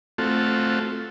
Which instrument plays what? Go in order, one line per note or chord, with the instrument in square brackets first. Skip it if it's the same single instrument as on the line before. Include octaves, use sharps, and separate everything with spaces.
[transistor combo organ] A3 C4 F4 F#4 A4